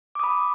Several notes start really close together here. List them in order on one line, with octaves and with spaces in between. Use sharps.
D6 D#6 B5